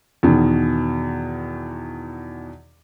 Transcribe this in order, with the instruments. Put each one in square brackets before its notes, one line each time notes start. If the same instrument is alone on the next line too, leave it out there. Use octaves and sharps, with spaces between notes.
[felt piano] E2 B2 D#3